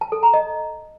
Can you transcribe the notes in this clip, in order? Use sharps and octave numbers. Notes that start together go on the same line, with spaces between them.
A5
A4
A#5
D#5